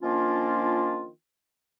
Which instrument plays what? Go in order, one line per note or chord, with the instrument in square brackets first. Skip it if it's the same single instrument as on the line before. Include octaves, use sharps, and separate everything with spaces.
[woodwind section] D#3 F3 A#3 C#4 D4 F4